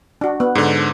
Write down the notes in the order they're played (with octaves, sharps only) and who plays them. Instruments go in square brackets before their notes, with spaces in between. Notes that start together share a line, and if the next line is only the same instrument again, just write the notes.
[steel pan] D4 F#4
B3
[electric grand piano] G#2 D3